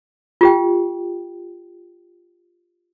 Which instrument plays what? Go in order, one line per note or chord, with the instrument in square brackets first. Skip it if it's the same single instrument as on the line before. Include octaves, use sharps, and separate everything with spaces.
[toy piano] F4 G4 G5